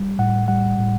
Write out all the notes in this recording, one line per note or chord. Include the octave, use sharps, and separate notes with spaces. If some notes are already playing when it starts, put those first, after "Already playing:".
Already playing: G3
A2 F#5
G3 F#5
A2